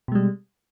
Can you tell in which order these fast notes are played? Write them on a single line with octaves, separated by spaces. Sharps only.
B2 G#3 G3